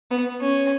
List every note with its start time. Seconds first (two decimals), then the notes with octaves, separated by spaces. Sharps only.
0.11 B3
0.41 C#4